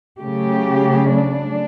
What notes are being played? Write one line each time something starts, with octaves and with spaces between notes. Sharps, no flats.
C#3 F#3 A3 G4
D4